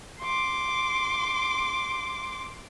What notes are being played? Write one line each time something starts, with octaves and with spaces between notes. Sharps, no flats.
C6 D6